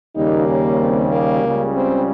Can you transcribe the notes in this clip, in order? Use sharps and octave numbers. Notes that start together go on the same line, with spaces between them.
D#2 C#3 G3 A#3 D#4
C#4
C4
A#3
C#2 C#3 G3
C4